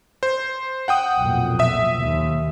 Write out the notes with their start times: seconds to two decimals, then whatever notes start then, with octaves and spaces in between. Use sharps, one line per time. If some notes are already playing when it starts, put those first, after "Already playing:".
0.23 C5
0.88 F#5 G5 D#6
1.19 B1 F2 A#2
1.59 E5 D#6
2.00 D#2